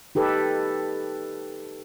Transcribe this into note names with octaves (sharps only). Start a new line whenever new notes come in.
D#4 G4 A4 B4